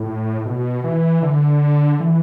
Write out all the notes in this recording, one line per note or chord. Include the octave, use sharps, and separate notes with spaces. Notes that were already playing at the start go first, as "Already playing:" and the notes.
Already playing: A2
B2
E3
D3
E3